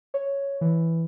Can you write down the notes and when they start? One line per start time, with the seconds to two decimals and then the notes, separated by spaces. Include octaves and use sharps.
0.14 C#5
0.61 E3